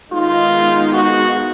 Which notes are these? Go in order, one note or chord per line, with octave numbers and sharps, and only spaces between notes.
D#3 G#3 B3 D#4 F4 G#4
F#4